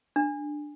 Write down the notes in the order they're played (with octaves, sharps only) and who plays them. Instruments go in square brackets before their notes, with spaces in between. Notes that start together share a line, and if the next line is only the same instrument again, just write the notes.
[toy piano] D4